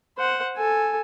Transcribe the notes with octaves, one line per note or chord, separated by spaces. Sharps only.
C5 F#5
A4 G#5